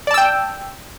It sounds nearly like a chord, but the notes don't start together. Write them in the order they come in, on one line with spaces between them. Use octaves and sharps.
D5 A5 E6 G5